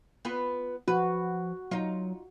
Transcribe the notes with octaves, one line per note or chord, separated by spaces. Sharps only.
B3 F4 B4
F3 F#4 B4
F#3 D#4 F4